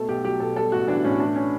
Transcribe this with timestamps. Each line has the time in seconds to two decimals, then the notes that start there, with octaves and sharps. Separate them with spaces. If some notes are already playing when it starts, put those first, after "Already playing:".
Already playing: B2 A3 A4
0.08 B1 G4
0.24 F#3 G4
0.40 B2 A4
0.56 G3 A4
0.72 A1 F#4
0.88 E3 D4
1.04 A2 C#4
1.20 E3 D4
1.36 C#4